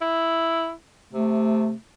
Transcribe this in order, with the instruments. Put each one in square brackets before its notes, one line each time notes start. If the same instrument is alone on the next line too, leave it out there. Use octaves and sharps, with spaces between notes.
[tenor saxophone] E4
[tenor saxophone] C3 [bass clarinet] A3